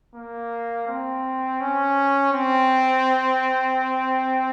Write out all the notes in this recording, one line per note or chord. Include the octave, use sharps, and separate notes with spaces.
A#3
C4
C#4
C4